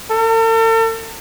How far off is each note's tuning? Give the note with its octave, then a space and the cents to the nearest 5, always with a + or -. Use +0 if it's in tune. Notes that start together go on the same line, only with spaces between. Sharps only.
A4 +45